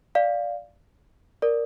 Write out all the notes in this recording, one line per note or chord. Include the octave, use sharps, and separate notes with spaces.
D5 F5
A#4 D5